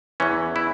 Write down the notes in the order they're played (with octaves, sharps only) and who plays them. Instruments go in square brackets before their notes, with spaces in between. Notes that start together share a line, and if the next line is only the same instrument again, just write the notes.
[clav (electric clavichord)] E2 E3 C#4
E4